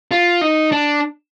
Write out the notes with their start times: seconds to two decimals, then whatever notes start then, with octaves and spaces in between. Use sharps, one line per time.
0.11 F4
0.41 D#4
0.72 D4